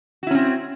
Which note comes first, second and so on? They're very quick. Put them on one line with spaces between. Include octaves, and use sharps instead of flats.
F#4 E4 C#4 C4